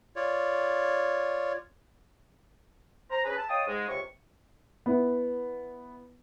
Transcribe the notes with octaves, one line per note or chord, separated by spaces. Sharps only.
F4 C#5 D5
C5 A#5
C#4 G#4 B4
A5
C#5 D#5 F5 G5 A5 D#6
G#2 G#3
C#2 C3 C#6
B3 E4